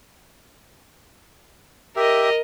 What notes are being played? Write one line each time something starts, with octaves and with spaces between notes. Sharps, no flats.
G4 A#4 D#5 E5